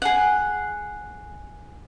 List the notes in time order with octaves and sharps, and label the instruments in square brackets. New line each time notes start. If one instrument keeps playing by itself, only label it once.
[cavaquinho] G#4 F#5